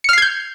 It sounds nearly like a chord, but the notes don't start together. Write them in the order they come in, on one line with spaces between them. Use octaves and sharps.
C#7 F6 C7 G#6 G6